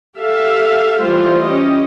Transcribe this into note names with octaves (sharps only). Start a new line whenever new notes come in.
G4 A4 E5 F5
E3 G3 A3 F4 C5
C#4 G4 D#5